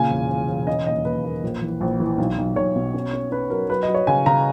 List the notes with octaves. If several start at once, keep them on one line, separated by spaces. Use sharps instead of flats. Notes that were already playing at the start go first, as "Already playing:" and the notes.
Already playing: A#2 C#3 G#5
E1
E1
E1
C#4 D#5
D#2 D#5
D#2 B4
A#3
A#1
E3
A#1
E3
B1
B1
B1 C#5
B2
C#4
C#4
C#4 B4
F#3 A#4
F#3 B4
D#5
F#3
C#5
C#3 G#5
C#3 A#5